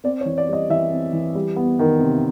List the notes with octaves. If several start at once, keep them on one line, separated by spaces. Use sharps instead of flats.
C4 D5
C#5
E3
D5
G3 D#5
E3 E5
C4
E3
G3
B3
D#3
C3